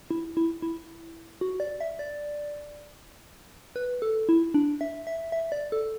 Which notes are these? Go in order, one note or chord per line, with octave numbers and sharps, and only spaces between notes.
E4
E4
E4
F#4
D5
E5
D5
B4
A4
E4
D4
E5
E5
E5
D5
A4